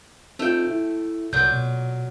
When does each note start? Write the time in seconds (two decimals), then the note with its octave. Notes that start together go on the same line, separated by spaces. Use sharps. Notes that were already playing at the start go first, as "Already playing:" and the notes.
0.39 A3 C4 D#4 F4 G5
0.71 E4
1.33 C2 A#2 F#3 G6
1.52 B2